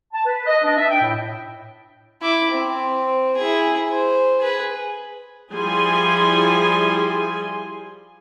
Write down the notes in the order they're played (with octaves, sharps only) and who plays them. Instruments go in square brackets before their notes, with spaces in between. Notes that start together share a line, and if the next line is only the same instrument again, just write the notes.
[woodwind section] A5
B4
D#5
D4
E5
G5
A2
[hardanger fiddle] E4 D6
C4
E4 G#4
C5
G#4 B4
[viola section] F3 G3 E4 G#4 G#5 C6